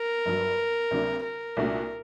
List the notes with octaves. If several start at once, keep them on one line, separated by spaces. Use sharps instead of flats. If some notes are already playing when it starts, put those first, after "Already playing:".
Already playing: A#4
G1 G2 F#3
D2 C3 F#3 A#3 D4
A#4
C2 A#2 A3 D4 F#4